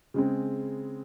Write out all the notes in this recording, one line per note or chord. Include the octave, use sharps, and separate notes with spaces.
C#3 G#3 C4